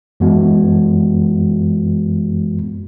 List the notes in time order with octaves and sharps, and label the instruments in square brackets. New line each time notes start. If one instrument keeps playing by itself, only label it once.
[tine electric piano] F#2 E3 G#3 B3 F#4